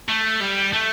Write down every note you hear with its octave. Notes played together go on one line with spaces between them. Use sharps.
A3
G3
A3